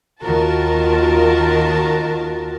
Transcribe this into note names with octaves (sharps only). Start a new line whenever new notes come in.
D#2 D#3 F4 F#4 A#4 A5